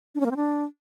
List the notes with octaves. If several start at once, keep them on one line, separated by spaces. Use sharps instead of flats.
D4
C#4
A#3
C4
D4